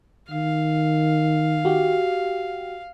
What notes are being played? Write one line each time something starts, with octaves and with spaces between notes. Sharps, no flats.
D#3 F5
F#4 G4